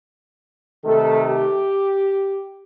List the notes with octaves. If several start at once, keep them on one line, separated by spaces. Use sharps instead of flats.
C3 D#3 A3 A4
G4